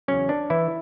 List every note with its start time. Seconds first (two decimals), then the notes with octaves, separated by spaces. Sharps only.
0.08 E2 C#3 F#3 C#4
0.29 D4
0.50 E3 E4